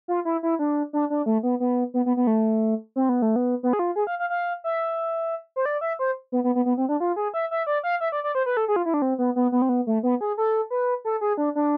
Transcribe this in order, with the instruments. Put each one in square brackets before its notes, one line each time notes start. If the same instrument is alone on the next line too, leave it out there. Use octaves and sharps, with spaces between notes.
[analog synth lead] F4
E4
E4
D4
D4
D4
A3
B3
B3
B3
B3
B3
A3
C4
B3
A3
B3
B3
G#4
F4
G#4
F5
F5
F5
E5
C5
D5
E5
C5
B3
B3
B3
B3
C4
D4
F4
G#4
E5
E5
D5
F5
E5
D5
D5
C5
B4
A4
G#4
F4
E4
D4
C4
B3
B3
B3
C4
B3
A3
B3
G#4
A4
B4
A4
G#4
D4
D4